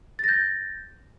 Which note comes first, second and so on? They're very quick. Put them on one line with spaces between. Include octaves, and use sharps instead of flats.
A6 A#6 G6